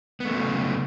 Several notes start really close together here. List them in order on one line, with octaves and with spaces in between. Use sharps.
B3 A3 C#3 F#3